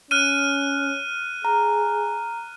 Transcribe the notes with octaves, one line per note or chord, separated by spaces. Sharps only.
C#4 F6 F#6 D#7
G#4 A#5